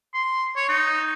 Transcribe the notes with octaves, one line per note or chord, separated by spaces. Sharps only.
C6
C#5
D#4